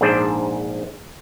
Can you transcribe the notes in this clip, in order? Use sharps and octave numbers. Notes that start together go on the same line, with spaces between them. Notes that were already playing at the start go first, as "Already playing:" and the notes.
A#1 G#2 D4 G#4 C5 D5